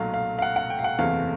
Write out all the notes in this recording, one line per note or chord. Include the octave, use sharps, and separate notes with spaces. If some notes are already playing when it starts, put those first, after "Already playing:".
Already playing: B1 A#2 F#3 A3 F5
F5
F5
F#5
F#5
G5
F5
F#5
F#1 E2 C3 E3 A3 F5